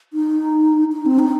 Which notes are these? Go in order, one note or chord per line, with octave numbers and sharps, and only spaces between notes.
D#4
D#4
C4
D#4